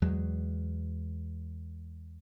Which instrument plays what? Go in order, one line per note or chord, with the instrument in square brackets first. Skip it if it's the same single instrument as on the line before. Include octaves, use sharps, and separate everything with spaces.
[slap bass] E2 F#3 G#3